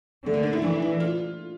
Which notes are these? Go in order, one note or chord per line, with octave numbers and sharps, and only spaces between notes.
D3 A3
A#3
D4
E4
E3 D4
E4
F4